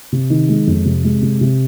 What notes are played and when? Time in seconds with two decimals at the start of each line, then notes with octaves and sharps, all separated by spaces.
0.12 C3
0.30 D#3
0.49 G#3
0.67 F2
0.85 C3
1.04 G#3
1.22 C3
1.41 C3